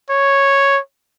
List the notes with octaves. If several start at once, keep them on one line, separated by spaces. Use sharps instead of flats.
C#5